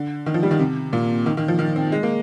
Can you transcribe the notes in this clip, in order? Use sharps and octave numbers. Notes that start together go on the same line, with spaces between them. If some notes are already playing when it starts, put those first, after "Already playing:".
Already playing: D3
D#3
F3
G3
D#3
C3
A#2
D#3
D#3
F3
D#3
C4
G#3
A#3